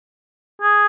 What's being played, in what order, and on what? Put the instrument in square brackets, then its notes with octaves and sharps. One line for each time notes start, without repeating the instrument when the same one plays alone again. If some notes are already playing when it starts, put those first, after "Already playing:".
[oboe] G#4